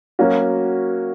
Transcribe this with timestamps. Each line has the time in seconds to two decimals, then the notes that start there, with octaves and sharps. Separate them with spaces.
0.19 F#3 A#3 C#4 F#4